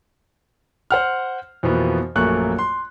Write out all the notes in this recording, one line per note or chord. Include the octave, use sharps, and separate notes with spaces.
C5 F#5 F6
F2 B2 E3 F3 A#3 B3
A#1 F#2 A3 A#3 C#6 F#6
C6